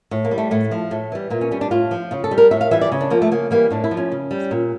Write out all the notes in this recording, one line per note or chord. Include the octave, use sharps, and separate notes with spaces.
A2
A#3
G3
A3
A2 A3
F3
A2 A3
E3 G3
A#2 A#3
C#4
G3 C#4
D4
A2 F4
F3
C#3 F4
A4
G3
A#4
A2 E5
F5
E3 G3 E5
D5
C#3
D4
F3 A#3
A3
C#3 A#3
E3 G3 A#3
A2 D4
E4
F3
C#4
C#3
G3
A#2